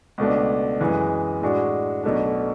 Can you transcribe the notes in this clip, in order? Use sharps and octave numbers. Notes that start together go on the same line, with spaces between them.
C#2 B2 A3 D4
F#2 E3 G#3
A2 G#3 D4 F#4
B1 B2 A3 D4